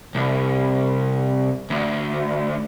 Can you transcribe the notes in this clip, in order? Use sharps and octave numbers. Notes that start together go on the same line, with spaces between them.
C2
D2